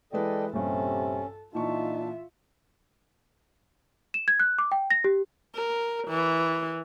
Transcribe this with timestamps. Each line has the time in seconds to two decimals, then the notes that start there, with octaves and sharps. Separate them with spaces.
0.13 E3 G#3 A4 B4 D5 D#5 G5
0.53 A#1 G2 C3 C#4 A4
1.55 A#2 E3 D4 D#4 F4 E5 A5 C#6
4.14 E7
4.28 G#6
4.40 F#6
4.58 D6
4.72 G5
4.91 A#6
5.04 G4
5.55 A#4
6.07 E3